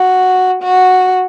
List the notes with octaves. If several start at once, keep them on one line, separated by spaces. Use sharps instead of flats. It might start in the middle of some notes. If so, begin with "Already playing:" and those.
Already playing: F#4
F#4